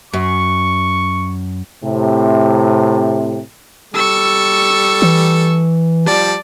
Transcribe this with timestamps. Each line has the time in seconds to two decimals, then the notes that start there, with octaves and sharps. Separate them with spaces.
0.13 F#2 C#6
1.83 A2 C3
3.94 G3 A4 C#6 E6
5.02 E3
6.06 F3 G3 D5 A5